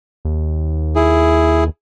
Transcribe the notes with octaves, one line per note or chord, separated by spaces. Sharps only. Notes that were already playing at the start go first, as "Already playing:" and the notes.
D#2
E4 G#4